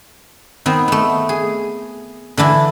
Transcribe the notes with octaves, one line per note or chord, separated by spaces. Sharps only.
D#3 B3 C4
A3 B3
G#4
D3 E3 D4 E4